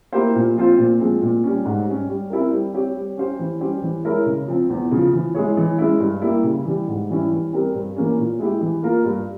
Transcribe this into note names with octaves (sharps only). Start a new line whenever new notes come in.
A#3 E4 G4 C5
A#2
F3 C4 F4 C5
A#2
F3 G#3 C4
A#2
G3 C#4
G#2
G3 C#4
G3
C4 E4 G4 A#4
G3
C4 G4 C#5
G3
C#4 G4 C5
E3
G3 C#4 G4 C5
E3
G#3 E4 A#4 C#5
C#3
F3 C4
E2
C#3 F3
E3
G#3 E4 G#4 C#5
E3
G#3 C#4 E4
G2
G3 A#3 E4
C#3
E3 G3
G#2
E3 G3 C#4 E4
E3
G3 C4 G4 A#4
G2
E3 A#3 C#4
A#2
G#3 E4 G4
E3
A#3 F4 A#4
G2